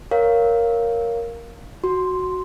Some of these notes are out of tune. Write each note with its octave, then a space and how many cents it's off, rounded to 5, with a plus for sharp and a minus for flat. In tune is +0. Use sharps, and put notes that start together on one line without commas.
A#4 +0 C#5 +0 F5 +0
F#4 +0 C6 +0